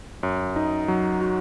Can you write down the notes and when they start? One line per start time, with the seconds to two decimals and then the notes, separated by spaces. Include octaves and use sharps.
0.23 F#2
0.56 D#4
0.88 F#3
1.21 F#4